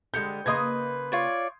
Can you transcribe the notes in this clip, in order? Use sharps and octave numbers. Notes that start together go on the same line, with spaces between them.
D3 G3 G#3 G6 C#7
C#3 A#3 B4 D#5 C6 D#6 G#6
F4 C#5 D5